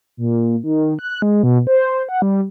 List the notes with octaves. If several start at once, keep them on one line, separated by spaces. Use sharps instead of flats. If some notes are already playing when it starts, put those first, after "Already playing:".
A#2
D#3
F#6
G#3
B2
C5
F#5
G3